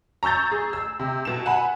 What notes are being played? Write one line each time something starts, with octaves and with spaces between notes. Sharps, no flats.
A#5 C#6 E6 G6 A6
G#4
E6
C3
B2 E7
F#5 G#5 B5